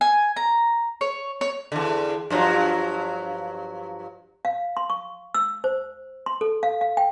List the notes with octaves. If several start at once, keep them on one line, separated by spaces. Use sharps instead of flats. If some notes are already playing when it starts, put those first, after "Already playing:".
G#5
A#5
C#5
C#5
E2 D3
G2 F3 F#3
F5
C6
C#6
E6
C5
C6
A4
F5
F5
G5